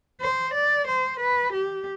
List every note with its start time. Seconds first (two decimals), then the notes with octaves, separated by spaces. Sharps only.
0.21 C5
0.54 D5
0.87 C5
1.20 B4
1.53 G4